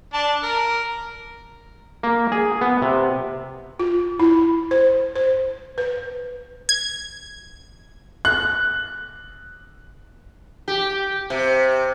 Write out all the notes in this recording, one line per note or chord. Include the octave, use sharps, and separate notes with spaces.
D4 A5
A#4
A#3
G#4
B3
C3
F4
E4
C5
C5
B4
G#6
F#6
G4
C3